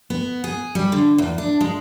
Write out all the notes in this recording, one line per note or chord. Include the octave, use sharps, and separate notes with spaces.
B3
G#4
G3
D3
E2
D4
G#3